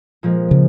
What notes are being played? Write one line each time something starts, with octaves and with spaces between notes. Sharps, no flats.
A#2 F3 G#3
C#3